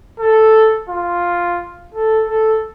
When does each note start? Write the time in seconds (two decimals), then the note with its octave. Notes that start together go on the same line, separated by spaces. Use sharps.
0.20 A4
0.89 F4
1.94 A4
2.29 A4